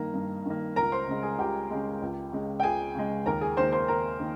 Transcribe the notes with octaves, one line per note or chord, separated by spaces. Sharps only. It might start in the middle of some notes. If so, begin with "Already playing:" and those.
Already playing: G2 D#3 A#3 A#5
G2
D#3 A#3
C#2 A#4 A#5
C5 C6
C#3 G#3
G#4 G#5
C#2 G4 G5
C#3 G#3
C#2
C#3 G#3
G5
C#2 G#4 G#5
C#3 G#3
D#2 A#4 A#5
G#4 G#5
D#3 A#3 C5 C6
C5 C6
D#2 A#4 A#5
D#3 A#3